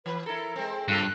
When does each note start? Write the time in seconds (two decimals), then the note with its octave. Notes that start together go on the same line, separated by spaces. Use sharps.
0.06 E3 B4
0.26 E4 A4 A#4
0.56 G#3 C4
0.88 G2 B2 F4 A4 F#6